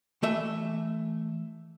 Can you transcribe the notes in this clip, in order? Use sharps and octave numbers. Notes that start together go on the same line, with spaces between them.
E3 A3 E5